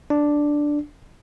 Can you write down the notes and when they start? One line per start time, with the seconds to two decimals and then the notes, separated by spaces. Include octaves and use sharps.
0.10 D4